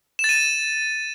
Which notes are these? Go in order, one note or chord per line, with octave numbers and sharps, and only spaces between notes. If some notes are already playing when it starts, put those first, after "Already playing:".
E7
A6
D#7
E7